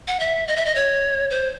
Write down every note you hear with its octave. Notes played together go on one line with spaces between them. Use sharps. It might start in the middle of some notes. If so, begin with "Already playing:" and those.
F#5
E5
D#5
E5
D#5
C#5
C5